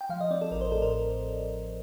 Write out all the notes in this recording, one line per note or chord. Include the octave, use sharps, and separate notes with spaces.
G5
F3 F5
D#5
C4 D5
A4
A1 A#4
C5
A2 A4
A#4